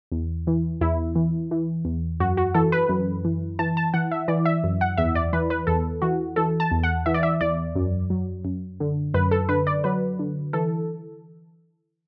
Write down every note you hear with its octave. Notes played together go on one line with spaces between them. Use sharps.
E2
E3
E2 E4
E3
E3
E2
F#2 F#4
F#4
E3 A4
B4
F#2
E3
E3 A5
A5
E3 F#5
E5
E3 D5
E5
F#2
F#5
E2 E5
D5
E3 B4
B4
E2 A4
E3 F#4
E3 A4
A5
E2
F#5
E3 E5
D5
E5
E2 D5
F#2
F#3
F#2
D3
F#2 B4
A4
D3 B4
D5
F#3 B4
D3
E3 A4